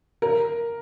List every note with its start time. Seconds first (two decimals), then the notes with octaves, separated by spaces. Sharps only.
0.22 A#4